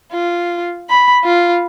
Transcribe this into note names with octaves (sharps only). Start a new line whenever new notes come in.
F4
B5
F4